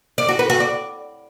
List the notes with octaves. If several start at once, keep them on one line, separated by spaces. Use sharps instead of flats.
D5
F#4
B4
F#4
D5